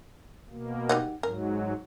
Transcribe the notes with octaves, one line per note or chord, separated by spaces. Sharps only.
B2 A#3
G3 D#4 F#4
G#2 F#3 A#4